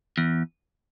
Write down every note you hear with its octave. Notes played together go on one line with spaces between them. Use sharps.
E2